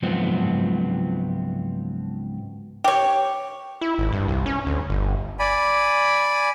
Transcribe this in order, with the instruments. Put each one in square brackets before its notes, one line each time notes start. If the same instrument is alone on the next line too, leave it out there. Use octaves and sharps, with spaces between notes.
[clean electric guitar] C#2 G#2 F3 F#3 B3 C4
[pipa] G4 C#5
[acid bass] E4
G#1
G2
C2
C#4
D2
G1
[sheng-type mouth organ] D5 G#5 B5